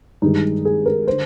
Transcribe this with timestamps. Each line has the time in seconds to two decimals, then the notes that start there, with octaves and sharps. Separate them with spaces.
0.22 G2 D#3 G#3 D#4
0.65 G#4
0.86 A#4
1.07 D3 C5